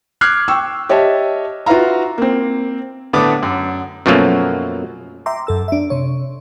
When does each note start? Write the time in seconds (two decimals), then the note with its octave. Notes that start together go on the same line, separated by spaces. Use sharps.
0.21 D6 F6 F#6 G#6 C7
0.48 G5 C#6 E6
0.89 G4 C#5 D#5 E5 A5
1.66 F4 F#4 B4 E5 F5 A#5
2.18 A#3 C4
3.13 A2 D3 A3 B3 D6 D#6
3.43 F#2
4.06 F#2 B2 F3 F#3 A3 A#3
5.26 E5 G5 A#5 C6 D6
5.47 F#2 A4 E6
5.68 D4 E5
5.90 C3 C#5